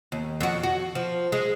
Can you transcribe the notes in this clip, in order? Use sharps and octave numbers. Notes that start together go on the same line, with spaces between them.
D#2
F2 F#4
F#4
F3
G#3